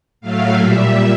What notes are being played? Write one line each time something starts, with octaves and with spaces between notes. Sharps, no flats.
A2 F#3 A3 F5
A#2 G3 E5